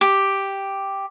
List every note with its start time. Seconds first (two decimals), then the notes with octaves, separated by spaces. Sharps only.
0.01 G4